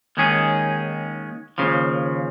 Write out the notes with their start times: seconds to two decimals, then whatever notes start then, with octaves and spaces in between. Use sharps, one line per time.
0.17 D#2 D#3 G#3 C#4 G#4
1.58 D#2 C#3 F3